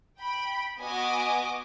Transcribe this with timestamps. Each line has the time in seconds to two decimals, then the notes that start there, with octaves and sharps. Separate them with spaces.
0.19 G5 B5
0.80 B3 F#4 D#5 G#5 D6